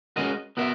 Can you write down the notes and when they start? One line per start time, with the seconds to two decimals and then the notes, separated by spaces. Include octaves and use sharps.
0.16 G#3 C#4 F#4 A#4 D#5
0.57 B3 F#4 A#4 E5